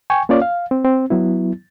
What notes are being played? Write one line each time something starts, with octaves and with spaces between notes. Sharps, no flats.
G5 G#5 C#6
A#3 C#4 F4 C#5 D5
F5
C4
C4
F#3 B3 E4